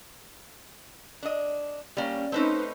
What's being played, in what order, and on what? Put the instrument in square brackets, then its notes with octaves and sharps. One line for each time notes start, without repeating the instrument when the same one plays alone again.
[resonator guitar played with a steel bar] D4 D#5
[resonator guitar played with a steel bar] G3 A#3 [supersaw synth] C#4
[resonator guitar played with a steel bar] A3 C4 C#4 [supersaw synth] D#4 B4 C5